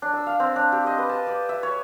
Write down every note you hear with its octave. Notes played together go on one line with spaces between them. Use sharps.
D4
E6
F5
C4
D4
G4
D#5
B4
A5
D5
E5
C#5